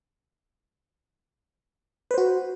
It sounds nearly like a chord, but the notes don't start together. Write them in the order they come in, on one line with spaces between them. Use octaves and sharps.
B4 C5 F#4